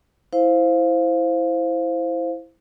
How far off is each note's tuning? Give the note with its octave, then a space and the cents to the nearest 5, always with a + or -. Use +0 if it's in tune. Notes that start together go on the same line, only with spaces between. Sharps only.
E4 -5 C5 +0 F5 +0